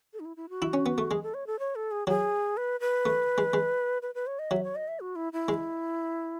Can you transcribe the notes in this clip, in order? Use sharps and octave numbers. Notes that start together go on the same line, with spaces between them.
A4
D#4
E4
E4
F#4
E4
C#4
B3
A3
G#3 G#4
A4
C#5
A4
C#5
A4
G#4
F#3 G#4
B4
B4
A3
G#3
G#3
B4
B4
C#5
D#5
F#3 E5
C#5
D#5
E5
F#4
E4
E4
G#3